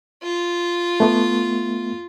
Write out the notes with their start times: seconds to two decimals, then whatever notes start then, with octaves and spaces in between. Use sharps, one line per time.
0.23 F4
1.00 A3 B3